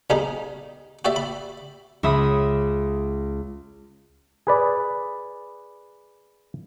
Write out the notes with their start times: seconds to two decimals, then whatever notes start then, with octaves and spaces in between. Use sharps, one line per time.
0.10 B1 G3 D#4 G#4
1.05 F#4 G4 D5 E5
1.16 B5
2.03 C#2 C#4 E5 B5 D#6
4.47 G#4 B4 D5